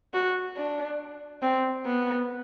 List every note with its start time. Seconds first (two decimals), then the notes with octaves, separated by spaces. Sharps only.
0.14 F#4
0.57 D4
1.42 C4
1.85 B3